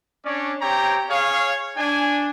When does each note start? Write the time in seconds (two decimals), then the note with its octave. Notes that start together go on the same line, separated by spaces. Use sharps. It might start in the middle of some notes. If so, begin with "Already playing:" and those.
0.25 C#4 D4 C#5 D5
0.60 C4 G4 C#5 G5 A#5
1.09 G#4 C#5 F5
1.76 D4 G#5